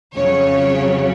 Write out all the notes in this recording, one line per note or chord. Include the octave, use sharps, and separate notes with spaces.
F2 C#3 F#3 C#5